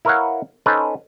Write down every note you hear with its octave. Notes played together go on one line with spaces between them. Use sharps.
E4 A#4 B4 C#5 F5 F#5
C#4 D#4 A4 B4 C5